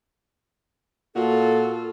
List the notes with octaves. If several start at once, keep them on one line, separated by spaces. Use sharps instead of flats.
A#2 F4 F#4 A4